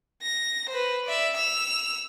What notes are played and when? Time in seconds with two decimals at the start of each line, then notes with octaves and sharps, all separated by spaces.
0.22 A#6
0.69 B4 C5
1.05 D5 E5
1.37 E6 F7